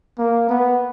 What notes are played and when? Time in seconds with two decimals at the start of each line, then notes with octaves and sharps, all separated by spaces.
0.18 A#3
0.49 B3